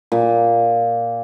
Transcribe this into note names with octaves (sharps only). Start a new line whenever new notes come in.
A#2